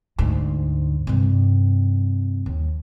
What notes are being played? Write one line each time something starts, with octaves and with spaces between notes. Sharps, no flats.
D2 G#2
G2 C3
D#2